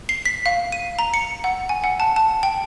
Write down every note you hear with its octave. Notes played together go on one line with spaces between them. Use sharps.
C7
B6
F5
D#7
A#5
C#7
F#5
G#5
F#5
A5
A5
G5